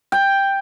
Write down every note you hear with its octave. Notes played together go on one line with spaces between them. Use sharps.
G5